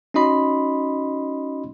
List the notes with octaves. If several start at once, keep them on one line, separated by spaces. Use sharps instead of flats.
C#4 D#4 F#4 D#5 B5 C6